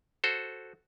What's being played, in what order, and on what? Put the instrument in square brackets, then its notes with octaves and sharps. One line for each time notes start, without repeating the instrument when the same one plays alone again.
[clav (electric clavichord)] F#4 A4 C5